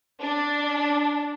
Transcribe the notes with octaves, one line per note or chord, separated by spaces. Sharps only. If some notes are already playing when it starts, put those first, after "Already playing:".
D4